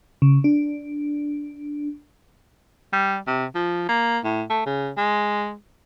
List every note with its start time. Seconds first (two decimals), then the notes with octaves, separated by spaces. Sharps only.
0.22 C#3
0.44 D4
2.93 G3
3.27 C3
3.55 F3
3.89 A#3
4.24 A2
4.50 A3
4.66 C#3
4.97 G#3